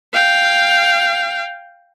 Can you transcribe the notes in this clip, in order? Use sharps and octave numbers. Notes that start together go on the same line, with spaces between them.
F5 G5